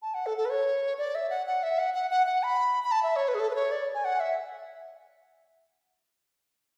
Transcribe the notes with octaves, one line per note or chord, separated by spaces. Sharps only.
A5
F#5
A4
A4
B4
C#5
D5
E5
F#5
F#5
E5
F#5
F#5
F#5
F#5
B5
B5
A5
E5
C#5
B4
G#4
A4
B4
C#5
D5
G#5
F#5
E5